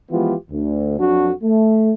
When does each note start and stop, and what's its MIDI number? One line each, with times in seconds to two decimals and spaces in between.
0.11 0.35 52
0.11 0.35 53
0.11 0.35 56
0.11 0.35 59
0.11 0.35 65
0.11 0.35 67
0.51 0.99 38
0.99 1.31 41
0.99 1.31 54
0.99 1.31 62
0.99 1.31 66
1.43 1.93 57